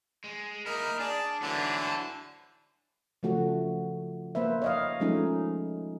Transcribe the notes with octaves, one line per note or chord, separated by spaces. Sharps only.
G#3
A#3 D#4 E4 A#4
D4 G#4 D5
D3 E3 F#3 A3 B3
G#2 D4
A4 C5
C#3 F3 A3 F#4
A#3 B4 C5 E5
C#5 D#5 F5
F3 G#3 A3 C#4 D#4